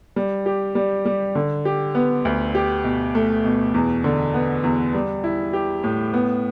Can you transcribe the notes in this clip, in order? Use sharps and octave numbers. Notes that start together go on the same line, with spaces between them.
G3
G4
G3
G3
D3
G4
B3
D2
G4
B2
A3
B2
E2
D3
B3
E2
G3
E4
G4
A2
B3